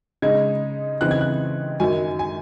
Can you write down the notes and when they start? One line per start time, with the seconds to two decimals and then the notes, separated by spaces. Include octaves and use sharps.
0.22 C#3 G#3 D#4 G#6
1.01 C#3 E3 C4 D#4 F#6
1.11 G#6
1.21 F#6
1.80 F#2 D#3 F#3 G#5
2.19 G#5